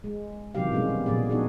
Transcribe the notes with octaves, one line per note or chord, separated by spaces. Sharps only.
G#3
C3 D#3 E3 F#3 G4 F5
B2 G3 G#3 B3 C#4
G3
A#2 F3 G#4 D5
B3 D4 D#4 F#4 G#4